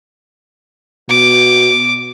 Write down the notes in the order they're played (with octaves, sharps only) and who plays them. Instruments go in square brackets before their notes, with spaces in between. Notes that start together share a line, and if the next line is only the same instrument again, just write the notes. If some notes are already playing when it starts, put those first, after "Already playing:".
[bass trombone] B2 [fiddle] D6